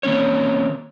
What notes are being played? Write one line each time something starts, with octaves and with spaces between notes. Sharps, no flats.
D#3 A#3 C4 C#4 C#5